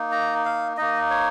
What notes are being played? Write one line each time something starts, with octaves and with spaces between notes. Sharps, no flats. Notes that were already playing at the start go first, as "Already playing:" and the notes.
Already playing: A#3 D#4
A#5
F5
A#3 D#4 D#5
C#5